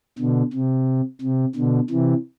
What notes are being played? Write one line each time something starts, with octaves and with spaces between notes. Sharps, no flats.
B2 D3
C3
C3
B2 D3
C3 E3